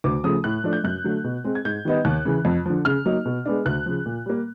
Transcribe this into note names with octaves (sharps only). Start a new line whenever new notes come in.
D2 D6
C#3 F3 A3 D#6
A2 F#6
F3 A3 D4
G6
F#2 F#6
D3 F#3 A3
B2
G#3 C4
G#6
G#2 G6
D#3 G3 B3 D#4
D#2 F#6
C#3 E3
F2
D3 F3
C#3 F6
F#3 A#3 D#4
B2
G#3 B3 D4
D2 F#6
C#3 F3
A#2
G3 A#3